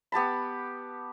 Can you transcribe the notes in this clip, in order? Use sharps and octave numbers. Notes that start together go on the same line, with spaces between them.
B3 G4 A5 B5